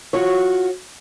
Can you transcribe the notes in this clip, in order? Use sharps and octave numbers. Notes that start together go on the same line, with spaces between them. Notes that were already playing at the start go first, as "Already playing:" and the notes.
F4 F#4 C#5